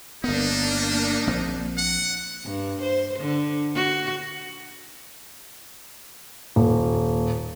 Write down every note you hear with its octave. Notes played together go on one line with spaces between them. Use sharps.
G1 A#3 B3 D4 D#4
A#1 C4
F#5
G2
C5
D3
F#4
D#1